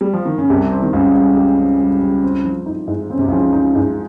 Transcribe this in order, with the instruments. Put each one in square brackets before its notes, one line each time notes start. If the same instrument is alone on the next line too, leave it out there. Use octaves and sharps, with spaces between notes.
[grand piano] G3
F3
D#3
C#3
[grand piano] C2 C3 [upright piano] G4
[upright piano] C4
[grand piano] D#3
[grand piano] C#2 C#3 [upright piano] G3
[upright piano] G3
G4
C4
G3
G3
C4
F3
D#4
G#2
[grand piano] C#3 [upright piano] C4
[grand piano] C3
[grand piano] C#2 C#3 [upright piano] F3
[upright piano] D#4
G#2